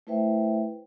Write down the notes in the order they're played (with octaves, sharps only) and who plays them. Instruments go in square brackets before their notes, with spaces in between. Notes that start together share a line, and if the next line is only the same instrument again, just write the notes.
[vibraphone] A3 E4 B4 C5 E5 G5